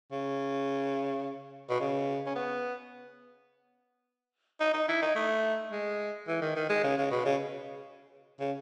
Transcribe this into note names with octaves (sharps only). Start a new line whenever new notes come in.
C#3
B2
C#3
C#4
B3
D#4
D#4
E4
D#4
A3
G#3
E3
D#3
D#3
G#3
C#3
C#3
B2
C#3
C#3